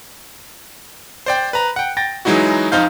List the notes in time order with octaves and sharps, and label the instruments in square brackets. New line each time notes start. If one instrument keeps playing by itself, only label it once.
[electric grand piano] C5 D5 G5
B4 A#5
F#5 G5
G5 A6 A#6
E3 F#3 G#3 D#4 E4 F#4
F2 D#4 C5 F5 G6